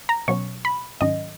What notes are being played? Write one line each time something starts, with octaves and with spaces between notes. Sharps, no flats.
A#5
B2 F#3 C#4 C#6
B5
G#2 D#3 F#3 C#4 D#5